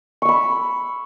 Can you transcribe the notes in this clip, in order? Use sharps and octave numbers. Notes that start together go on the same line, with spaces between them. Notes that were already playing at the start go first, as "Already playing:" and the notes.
B5 C#6 E6